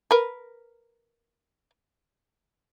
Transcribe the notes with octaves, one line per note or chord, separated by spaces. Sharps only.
A#4 B4